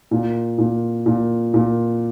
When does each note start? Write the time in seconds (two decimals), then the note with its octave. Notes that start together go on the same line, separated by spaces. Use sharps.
0.11 A#2
0.58 A#2
1.06 A#2
1.54 A#2